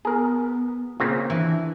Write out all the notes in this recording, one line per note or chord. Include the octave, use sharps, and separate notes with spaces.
B3 G#4 A#4
A#2 C#3 C4
E3 D4